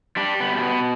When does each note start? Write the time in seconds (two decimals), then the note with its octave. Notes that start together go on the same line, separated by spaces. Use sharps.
0.17 G3 D4
0.40 B3
0.52 B2
0.57 A3
0.62 B3